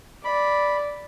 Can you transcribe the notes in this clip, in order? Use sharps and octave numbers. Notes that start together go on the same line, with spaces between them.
D5 B5